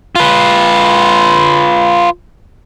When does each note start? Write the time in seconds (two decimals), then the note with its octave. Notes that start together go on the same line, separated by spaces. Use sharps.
0.16 F4 B4